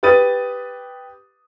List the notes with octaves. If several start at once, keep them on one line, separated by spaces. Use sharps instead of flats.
G4 B4 D#6 A6 D#7